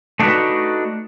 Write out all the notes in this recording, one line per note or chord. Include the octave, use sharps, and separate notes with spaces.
A3 D4 D#4 F4 F#4 B4